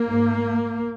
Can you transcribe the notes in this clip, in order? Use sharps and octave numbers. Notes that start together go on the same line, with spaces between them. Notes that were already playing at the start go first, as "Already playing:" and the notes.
Already playing: A#3
G#2